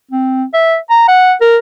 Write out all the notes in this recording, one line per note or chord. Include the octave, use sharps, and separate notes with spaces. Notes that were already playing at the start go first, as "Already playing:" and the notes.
C4
E5
A#5
F#5
A#4